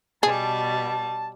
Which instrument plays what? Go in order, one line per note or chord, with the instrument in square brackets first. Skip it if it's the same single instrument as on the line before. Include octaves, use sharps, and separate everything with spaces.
[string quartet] B2 G3 [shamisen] G#4 [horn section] A5